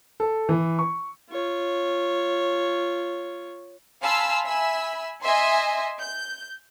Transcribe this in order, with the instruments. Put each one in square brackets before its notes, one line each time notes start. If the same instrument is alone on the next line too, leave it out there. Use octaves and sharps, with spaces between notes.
[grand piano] A4
E3
C#6
[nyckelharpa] F4 C#5
[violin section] F5 G#5 A5 B5 C6 E6
E5 G#5 B5 E6
D#5 E5 G#5 C6
G6